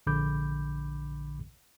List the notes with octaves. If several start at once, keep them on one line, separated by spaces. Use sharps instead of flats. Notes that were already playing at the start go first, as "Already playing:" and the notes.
A#1 D3 B5 D6 G6